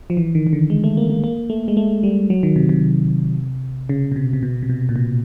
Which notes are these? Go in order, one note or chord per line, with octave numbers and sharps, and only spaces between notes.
F3
E3
D#3
D#3
D3
G#3
A3
A#3
A#3
A#3
A3
G#3
A3
G3
F#3
D#3
C3
C3
C#3
B2
C3
C3
B2
C3
B2
A#2
B2